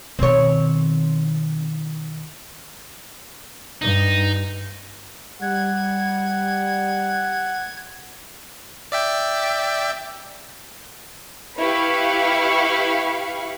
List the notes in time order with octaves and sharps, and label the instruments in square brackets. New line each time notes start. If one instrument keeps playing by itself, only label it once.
[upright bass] B2 D#3 [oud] C4 C#5
[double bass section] G2 [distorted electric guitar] D#4
[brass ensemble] G3 [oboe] F#5 [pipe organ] G#6
[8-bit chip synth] D5 E5 G5
[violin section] E4 G4 B4 F5 B5 C#6